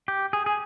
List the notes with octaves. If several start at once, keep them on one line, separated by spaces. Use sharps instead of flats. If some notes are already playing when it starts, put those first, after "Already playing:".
G4
G#4
G#4